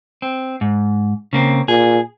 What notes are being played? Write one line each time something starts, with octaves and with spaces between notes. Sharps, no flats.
C4
G#2
C#3 A#3 C4
A#2 G#4